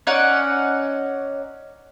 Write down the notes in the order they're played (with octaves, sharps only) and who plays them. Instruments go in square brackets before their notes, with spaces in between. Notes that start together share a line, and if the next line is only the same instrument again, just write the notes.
[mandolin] C#4 D#4 D5 F#5